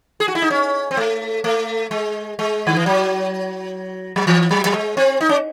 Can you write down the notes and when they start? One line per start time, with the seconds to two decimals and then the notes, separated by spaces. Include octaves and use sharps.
0.20 G#4
0.28 F#4
0.35 E4
0.42 D#4
0.50 C#4
0.91 C4
0.97 A3
1.44 A3
1.91 G#3
2.39 G#3
2.67 D#3
2.76 E3
2.86 F#3
4.16 F#3
4.27 E3
4.51 F#3
4.65 F#3
4.74 G#3
4.97 C4
5.21 D#4
5.29 C#4